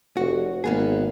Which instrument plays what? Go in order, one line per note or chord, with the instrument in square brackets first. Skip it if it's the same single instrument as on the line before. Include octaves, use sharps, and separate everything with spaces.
[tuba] F1 [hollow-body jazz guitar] F#4
[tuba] G#1 [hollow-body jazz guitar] A#3 B3 G#4